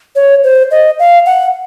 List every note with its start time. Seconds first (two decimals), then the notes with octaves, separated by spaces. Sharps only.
0.16 C#5
0.44 C5
0.71 D#5
0.99 F5
1.26 F#5